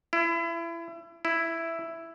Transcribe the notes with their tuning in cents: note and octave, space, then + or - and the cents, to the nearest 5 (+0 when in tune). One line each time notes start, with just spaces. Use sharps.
E4 +30
E4 +5